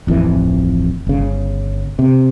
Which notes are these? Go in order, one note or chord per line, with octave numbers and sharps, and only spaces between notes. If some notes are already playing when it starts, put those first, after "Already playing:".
D1 A1 F2 E3
G1 C#3
C3